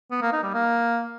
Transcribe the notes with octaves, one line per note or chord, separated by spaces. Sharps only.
B3
A#3
D#4
G3
A#3